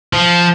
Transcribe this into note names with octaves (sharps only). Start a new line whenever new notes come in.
F3